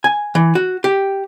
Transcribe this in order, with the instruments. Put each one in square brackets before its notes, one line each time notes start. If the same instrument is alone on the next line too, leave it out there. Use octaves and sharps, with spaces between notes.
[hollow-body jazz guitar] G#5
E3
F#4
G4